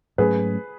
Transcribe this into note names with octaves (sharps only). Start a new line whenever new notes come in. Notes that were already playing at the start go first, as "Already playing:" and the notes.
G#2 F#3 A3 C#4 G#4 B4